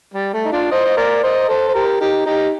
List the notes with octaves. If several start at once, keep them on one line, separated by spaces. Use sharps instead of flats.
G3
A3
D#4
D4 F4
C5 D#5
D#5
A#4 D5
C5 D#5
A4 C5
C5
G4 A#4
D#4 G4
D#4 G4